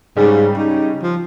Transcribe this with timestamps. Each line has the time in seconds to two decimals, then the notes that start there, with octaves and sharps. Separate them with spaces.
0.16 G#2 C#3 G3
0.57 D#4
1.02 F3